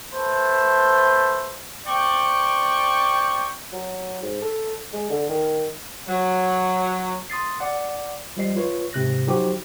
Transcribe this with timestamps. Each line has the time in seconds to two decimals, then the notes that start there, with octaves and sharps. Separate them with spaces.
0.13 A3 B4 C5 A5
1.87 C4 D5 G5 C#6
3.73 F#3
4.22 G#2
4.42 A4
4.93 G#3
5.10 D3
5.29 D#3
6.08 F#3
7.30 C6 D#6 A6 C7
7.60 D5 F#5
8.37 F3 G3 D#5 C7
8.56 F4 B4 C#5
8.93 G#2 C3 F#6 A#6
9.27 F3 F#3 D#4 F#4 G4 C5